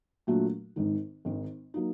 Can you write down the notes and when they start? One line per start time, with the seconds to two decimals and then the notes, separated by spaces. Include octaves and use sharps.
0.27 A#2 F#3 A3 D4 F#4
0.76 G#1 G#2 D#3
1.25 G#1 G#2 D#3
1.74 F#3 A#3 D#4